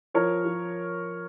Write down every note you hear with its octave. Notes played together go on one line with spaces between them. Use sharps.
F3 A#4 C#5
F3